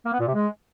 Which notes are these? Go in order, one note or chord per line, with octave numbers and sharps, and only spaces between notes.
A#3
B3
A#2
C3
G#3